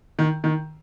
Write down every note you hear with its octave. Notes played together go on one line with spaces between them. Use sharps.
D#3
D#3